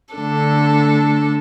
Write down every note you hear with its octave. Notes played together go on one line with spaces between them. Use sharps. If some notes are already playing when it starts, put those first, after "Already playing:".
D3 A3 D4 A4